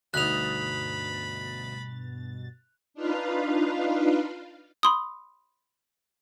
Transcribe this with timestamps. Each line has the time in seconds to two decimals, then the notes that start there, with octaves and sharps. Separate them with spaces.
0.14 D2 G2 B2 D#4 B5 F#6 A6 F7
2.94 D4 D#4 F4 B4 F5
4.83 B5 C6 D#6